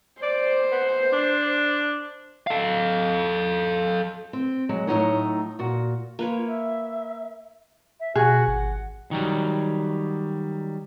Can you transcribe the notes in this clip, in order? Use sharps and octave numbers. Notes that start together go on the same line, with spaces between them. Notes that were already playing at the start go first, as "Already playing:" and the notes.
C5 D5
B3
D4
A4 F5
C4
F#3 G#3
A2 F#3 A3 D#4 C#5 F#5
A#2 F#4
A#3 F4 B4 C#5
E5
E5
B2 F#4 G#4
G#1 F#5
D#3 F#3 G3